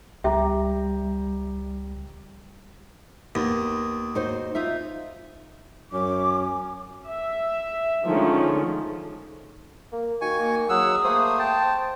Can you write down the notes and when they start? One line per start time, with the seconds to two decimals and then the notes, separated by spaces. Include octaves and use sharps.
0.24 C#2 G3 G4 E5 A#5
3.35 D#2 B3
4.15 D#4 F#4 C5
4.55 D#4 F4 E5
5.92 F#2 C#4 D6
7.06 E5
8.05 D3 D#3 F3 G#3 A3 C#4
9.93 A#3
10.21 D#3 F#4 G#5 C#6
10.39 A#3
10.69 F#3 G#4 F#5 E6
11.04 A3 A#3 C5 D#6
11.39 G5 A5